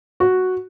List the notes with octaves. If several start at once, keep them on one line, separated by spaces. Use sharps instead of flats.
F#4